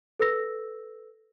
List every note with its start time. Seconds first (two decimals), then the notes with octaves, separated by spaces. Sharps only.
0.20 A4 B4 E6 A#6